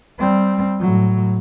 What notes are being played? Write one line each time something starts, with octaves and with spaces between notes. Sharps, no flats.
G3 C4
A2 F#3